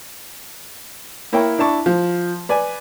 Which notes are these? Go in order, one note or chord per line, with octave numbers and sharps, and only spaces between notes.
A#3 E4 A#4 C#5 G5 C#6
D4 E4 A5 C#6 D6
F3
B4 D5 G#5